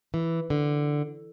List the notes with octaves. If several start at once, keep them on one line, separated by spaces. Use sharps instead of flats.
E3
D3